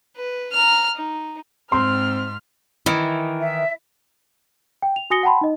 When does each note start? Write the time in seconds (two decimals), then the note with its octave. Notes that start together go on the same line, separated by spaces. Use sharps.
0.17 B4
0.52 A#5 F6
0.96 D#4
1.72 G#2 C4 C6 F6
2.86 D#3 E3 E4
3.41 E5
4.82 G5
4.96 F7
5.10 F#4 G#5 D#6 A#6 C#7 G7
5.23 F#5 G5 A5 B5 C6
5.41 D#4 D#5